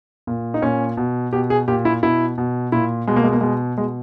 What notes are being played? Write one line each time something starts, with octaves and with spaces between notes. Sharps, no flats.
A#2
D#4
A#2 C#4
B2
B2 G4
G#4
A#2 G4
E4
B2 E4
B2
A#2 E4
B2 G#3
A#3
G#3
A#3
B2 G#3
B2 G#3